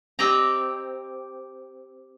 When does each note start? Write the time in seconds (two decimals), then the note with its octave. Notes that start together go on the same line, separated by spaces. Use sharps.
0.19 C4 G4 D5 D#5 A#5